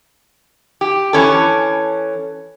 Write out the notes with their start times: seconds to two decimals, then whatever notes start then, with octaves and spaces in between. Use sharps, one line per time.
0.81 G4
1.13 E3 C#4 A4